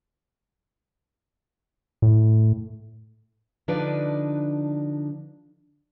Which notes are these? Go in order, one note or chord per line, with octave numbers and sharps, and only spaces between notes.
A2
D3 F3 D4 D#4 B4 D5